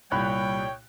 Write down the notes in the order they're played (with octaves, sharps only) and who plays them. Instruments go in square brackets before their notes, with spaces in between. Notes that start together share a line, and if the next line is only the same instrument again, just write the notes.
[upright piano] C2 A#2 [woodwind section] G3 [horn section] C#5 G5 [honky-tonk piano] B5 F#6